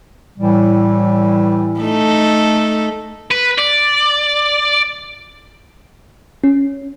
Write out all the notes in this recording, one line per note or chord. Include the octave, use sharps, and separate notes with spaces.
A2 E3 G3
A3 D#4 A4
B4
D5
C#4